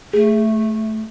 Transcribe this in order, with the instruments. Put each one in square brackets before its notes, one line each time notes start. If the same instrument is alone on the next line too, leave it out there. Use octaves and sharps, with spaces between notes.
[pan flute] A3 [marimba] G#4